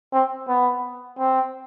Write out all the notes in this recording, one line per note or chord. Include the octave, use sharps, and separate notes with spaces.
C4
B3
C4